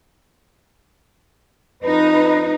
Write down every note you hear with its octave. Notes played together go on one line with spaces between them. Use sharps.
F2 D#4 B4